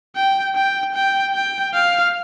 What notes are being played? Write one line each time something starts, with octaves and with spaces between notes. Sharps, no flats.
G5
G5
G5
G5
F5